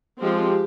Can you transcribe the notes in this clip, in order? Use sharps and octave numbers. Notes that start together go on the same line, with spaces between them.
F3 G#3 C4 G4